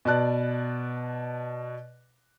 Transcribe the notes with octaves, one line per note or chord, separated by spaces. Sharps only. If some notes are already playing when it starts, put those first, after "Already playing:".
B2 B4 D5 A5 F#6